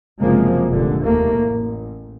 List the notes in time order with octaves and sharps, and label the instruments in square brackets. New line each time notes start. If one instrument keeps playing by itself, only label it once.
[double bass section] F#1 C3 F3 G#3 A#3
F1 A#1 A#2 D3
D#2 A3 A#3
A1